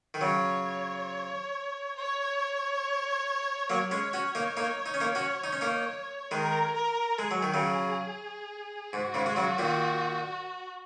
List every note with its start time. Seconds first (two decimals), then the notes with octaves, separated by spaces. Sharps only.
0.14 D#3
0.21 C#3 F#3 C#5
1.96 C#5
3.70 F#3 A#3 C#5
3.91 G#3 C#4
4.13 C#4 F#4
4.35 A#3 D#4
4.57 A#3 D#4
4.86 D#4
4.94 C#4
5.01 A#3 D#4
5.15 C#4 F#4
5.44 D#4
5.53 C#4
5.61 A#3 D#4
6.31 D#3 G#3 A#4
6.74 A#4
7.19 G#3 G#4
7.31 F#3
7.43 D#3
7.54 C#3 F#3
8.93 G#2 F#4
9.14 G#2 C#3
9.26 G#3
9.36 C#3 F#3
9.58 A#2 D#3